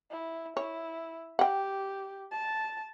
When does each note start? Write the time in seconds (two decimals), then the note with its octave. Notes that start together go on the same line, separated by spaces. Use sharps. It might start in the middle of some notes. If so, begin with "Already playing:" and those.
0.11 E4
0.57 E4 C#5
1.39 G4 F#5 G5
2.32 A5